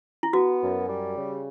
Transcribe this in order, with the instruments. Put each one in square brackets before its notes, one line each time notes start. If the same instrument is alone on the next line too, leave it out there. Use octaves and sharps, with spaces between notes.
[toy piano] E4
[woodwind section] B3 [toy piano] F#4
[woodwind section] F#2
G3
C#3